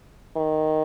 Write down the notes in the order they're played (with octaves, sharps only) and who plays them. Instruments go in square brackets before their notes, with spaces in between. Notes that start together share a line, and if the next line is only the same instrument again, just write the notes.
[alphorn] D#3